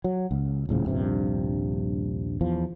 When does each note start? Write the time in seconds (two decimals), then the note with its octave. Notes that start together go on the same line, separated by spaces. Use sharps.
0.04 F#3
0.31 C#2
0.69 D#1 A2 C#3 F3
0.87 D#1 A#1 G2 C3
2.41 E2 F3